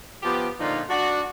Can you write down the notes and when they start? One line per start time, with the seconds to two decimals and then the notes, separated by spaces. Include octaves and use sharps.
0.23 F3 B3 G4
0.60 A#2 D3 F3 D#4 F4
0.89 D4 F#4